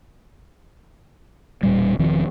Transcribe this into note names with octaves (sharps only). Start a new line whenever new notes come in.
E1 A#2 G3
E1 D#3 F3 C4